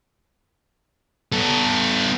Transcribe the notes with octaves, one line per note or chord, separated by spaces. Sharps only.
B3 A4